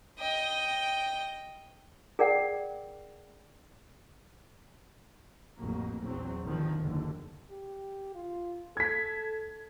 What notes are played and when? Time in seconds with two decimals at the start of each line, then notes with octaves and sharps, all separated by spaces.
0.19 D#5 G5
2.19 G#4 A#4 D5 F#5 G5
5.58 A1 F2 F#3 A#3
6.02 A#1 E2 F#3 C4
6.45 A1 E2 A2 D3 D#3 F3
6.79 F#1 D#2 D3
7.51 G4
8.15 F4
8.77 A4 G#6 B6